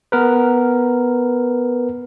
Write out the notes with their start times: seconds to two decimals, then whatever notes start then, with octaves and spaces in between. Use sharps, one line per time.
0.12 B3 A#4 B4